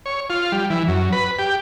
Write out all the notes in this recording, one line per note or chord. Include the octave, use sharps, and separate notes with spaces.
C#5
F4
G3
E3
F#2
B4
G4